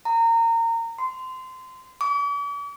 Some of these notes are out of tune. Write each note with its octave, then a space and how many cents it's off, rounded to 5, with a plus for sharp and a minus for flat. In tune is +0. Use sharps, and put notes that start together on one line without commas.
A#5 -25
C6 -20
D6 -45